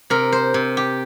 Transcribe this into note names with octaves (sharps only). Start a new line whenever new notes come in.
C3 A#4
C5
C3
G4